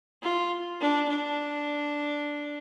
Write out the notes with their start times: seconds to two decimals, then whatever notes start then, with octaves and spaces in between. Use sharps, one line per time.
0.23 F4
0.81 D4
1.09 D4